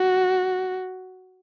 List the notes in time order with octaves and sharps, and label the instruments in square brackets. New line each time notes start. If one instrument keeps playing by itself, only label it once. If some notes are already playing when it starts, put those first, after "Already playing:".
Already playing: [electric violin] F#4